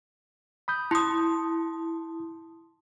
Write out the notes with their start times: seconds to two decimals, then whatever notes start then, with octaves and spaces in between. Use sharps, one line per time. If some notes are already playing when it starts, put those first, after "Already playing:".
0.68 B5 D#6 G6
0.91 E4 A5 C6 D#6